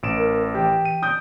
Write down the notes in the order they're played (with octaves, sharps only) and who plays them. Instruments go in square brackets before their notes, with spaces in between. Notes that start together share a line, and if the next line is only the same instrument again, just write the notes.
[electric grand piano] A1 D7 E7
[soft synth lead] A#4
[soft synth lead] E3 [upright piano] G4
[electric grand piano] D#7
[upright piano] D#6 G6 [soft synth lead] D7